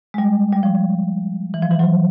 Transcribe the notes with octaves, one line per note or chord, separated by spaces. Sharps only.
G#3
G3
G3
F3
F3
E3
F3
E3
F#3